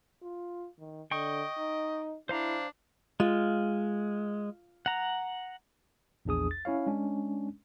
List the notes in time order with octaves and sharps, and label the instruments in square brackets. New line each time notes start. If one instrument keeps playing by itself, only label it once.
[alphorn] F4
D#3
[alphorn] D3 [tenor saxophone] D#5 [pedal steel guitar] G5 C#6
[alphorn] D#4
[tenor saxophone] D4 [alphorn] E4 [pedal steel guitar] C5 F5 A#5
[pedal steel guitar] G#3 [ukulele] F4
[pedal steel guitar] F#5 A#5
[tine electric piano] A#1 E2 D4 G#4 D#6
A6
C#4 E4 C#5 F5
G#3 C#4 D4